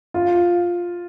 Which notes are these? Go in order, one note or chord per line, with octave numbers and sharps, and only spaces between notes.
F4